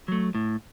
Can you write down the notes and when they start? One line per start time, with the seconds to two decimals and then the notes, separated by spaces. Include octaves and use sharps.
0.08 F#3 A3
0.35 A2